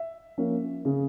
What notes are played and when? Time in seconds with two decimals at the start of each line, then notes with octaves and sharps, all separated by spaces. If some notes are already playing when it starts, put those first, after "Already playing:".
Already playing: E5
0.38 F3 A#3 C#4
0.85 C#3